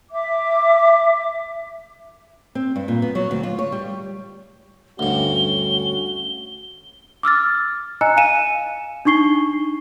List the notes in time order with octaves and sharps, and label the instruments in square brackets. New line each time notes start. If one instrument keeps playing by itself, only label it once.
[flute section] E5 D6
[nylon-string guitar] C4
G2
A#2
B3
F#3
D2
F4
C#5
G3
[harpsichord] D2 G2 [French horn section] C#4 F#4 [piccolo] G7
[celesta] D6 E6 F6 A6
D#5 G#5 A#5 E6 F#6 C#7
F5 G#5 C#7 D#7 E7
D4 D#4 C#6 C7 G7